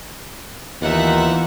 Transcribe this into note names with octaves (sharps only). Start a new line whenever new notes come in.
D#2 E3 B3 D#4 F4 E5 F#5